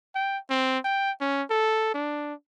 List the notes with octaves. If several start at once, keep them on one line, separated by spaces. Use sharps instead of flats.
G5
C4
G5
C#4
A4
D4